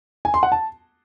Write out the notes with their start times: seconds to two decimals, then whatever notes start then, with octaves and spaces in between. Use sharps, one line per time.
0.25 G#5
0.34 C6
0.43 F#5
0.52 A5